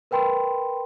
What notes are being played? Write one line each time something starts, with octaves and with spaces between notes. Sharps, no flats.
A#4 B4 G5 B5 C6